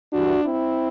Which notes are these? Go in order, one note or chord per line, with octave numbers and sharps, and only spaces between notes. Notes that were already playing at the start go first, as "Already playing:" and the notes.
G2 E3 G3 D4 F#4
C4 E4